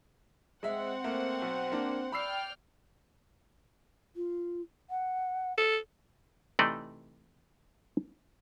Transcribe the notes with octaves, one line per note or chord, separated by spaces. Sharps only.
G#3 C4 E5 F#5
A3 A#3
B1
A#3 D4
D5 G5 B5 E6 F6 C7
F4
F#5
A4
C3 E3 A3 D#4 D5 D#5